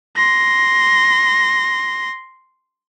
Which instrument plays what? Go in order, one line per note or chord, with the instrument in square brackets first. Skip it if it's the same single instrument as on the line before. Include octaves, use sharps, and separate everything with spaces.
[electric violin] C6 A#6